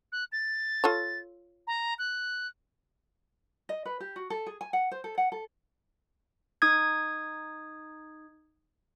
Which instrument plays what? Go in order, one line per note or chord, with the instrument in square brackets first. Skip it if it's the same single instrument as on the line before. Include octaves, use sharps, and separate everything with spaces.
[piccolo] F#6
A6
[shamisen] F4 A4 C#5
[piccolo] A#5
F#6
[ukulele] D#5
B4
G4
F#4
A4
G#4
G#5
F#5
C5
A4
F#5
A4
[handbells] D#4 D#6 G#6